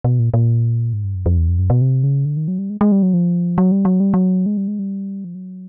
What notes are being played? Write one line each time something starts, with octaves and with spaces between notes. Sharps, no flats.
B2
A#2
A#2
G#2
G2
F#2
F2
E2
F2
F#2
B2
C3
C#3
D3
D#3
F#3
G3
G#3
G#3
G3
F#3
F3
F#3
G3
F#3
G3
F#3
G#3
G3
G#3
G3
F3
F#3